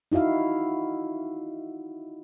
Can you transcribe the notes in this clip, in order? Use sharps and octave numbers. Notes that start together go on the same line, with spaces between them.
D#4 E4 F#4 E5 F5